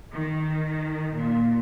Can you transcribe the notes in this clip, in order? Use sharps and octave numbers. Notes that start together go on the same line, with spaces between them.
D#3
A#2